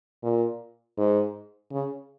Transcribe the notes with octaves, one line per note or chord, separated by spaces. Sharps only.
A#2
G#2
C#3